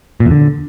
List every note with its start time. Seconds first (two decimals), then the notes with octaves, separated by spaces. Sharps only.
0.20 A#2
0.26 E2
0.31 D3